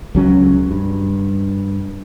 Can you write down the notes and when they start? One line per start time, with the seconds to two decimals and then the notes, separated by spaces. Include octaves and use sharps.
0.15 C#2 F#3 C#4
0.71 G2